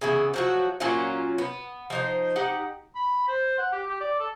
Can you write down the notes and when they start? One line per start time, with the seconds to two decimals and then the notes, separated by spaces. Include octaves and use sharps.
0.01 C#3 E3 B3
0.34 F3 F#3 F#4
0.80 A#2 F#3 C#4 F4
1.38 B3
1.90 F3 D#4 C5
2.36 D#4 G4 F#5
2.95 B5
3.28 C5
3.58 F#5
3.72 G4
3.86 G4
4.01 D5
4.20 A4